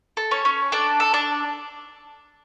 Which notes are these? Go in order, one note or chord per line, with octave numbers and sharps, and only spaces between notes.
A4
C#4 C#5
C#4
D4 A4 D5
A4
D4 D5